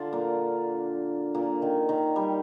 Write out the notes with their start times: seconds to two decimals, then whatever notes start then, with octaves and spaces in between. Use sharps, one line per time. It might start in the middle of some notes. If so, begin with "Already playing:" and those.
Already playing: D3 D4 F4
0.13 A#2 A#3
1.34 A#2 A#3
1.62 D#3
1.89 D#3
2.16 G3